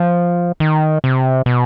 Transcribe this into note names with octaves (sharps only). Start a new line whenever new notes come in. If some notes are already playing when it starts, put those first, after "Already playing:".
Already playing: F3
D#3
C3
B2